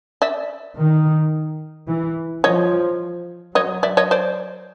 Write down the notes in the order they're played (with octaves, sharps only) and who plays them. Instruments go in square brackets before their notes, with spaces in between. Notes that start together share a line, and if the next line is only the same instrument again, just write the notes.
[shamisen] D5 E5
[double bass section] D#3
E3
[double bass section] F3 [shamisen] C#5 D#5
[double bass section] F#3 [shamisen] C#5 D#5
[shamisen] D5 E5
C#5 D#5
C5 D5